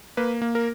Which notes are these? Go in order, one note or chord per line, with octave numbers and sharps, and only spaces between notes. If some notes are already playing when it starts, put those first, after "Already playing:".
A#3 B4
A#3
A#4